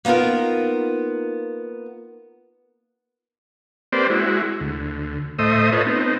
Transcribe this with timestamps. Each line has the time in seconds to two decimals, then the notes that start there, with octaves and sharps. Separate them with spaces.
0.05 A#3 B3 D#4 F4 A#4
3.92 A#3 C4 G4 B4 C5 D5
4.10 G#3 E4 F#4
4.60 D2
5.39 A2 A3 C5 D#5 E5 D#6
5.72 F4 A4 B4 C#5 D#5
5.87 B3 C4 D#4